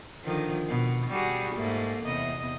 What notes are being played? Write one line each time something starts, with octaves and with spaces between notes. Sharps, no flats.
D3 D#3 F3
B2
G3 F#4 G#4
G#2 A3 A#3
E2 C3 D#5